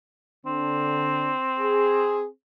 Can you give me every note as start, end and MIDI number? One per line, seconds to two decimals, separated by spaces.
0.46 1.32 50
0.46 2.30 60
0.46 1.32 62
1.60 2.26 68